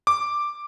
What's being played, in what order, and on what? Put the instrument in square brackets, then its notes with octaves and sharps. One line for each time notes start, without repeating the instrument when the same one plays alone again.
[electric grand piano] D6